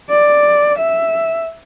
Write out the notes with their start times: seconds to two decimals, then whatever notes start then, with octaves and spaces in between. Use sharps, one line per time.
0.10 D5
0.78 E5